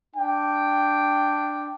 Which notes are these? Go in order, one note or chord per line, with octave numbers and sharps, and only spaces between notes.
D4 G5